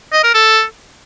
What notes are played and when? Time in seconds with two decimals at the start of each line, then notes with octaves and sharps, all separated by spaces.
0.13 D#5
0.23 A#4
0.34 A4